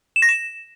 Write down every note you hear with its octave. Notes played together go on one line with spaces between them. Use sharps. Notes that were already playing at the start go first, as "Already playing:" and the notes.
E7
A#6
E7